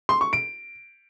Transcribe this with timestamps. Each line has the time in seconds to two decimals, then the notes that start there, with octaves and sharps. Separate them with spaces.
0.09 C6
0.21 C#6
0.33 D7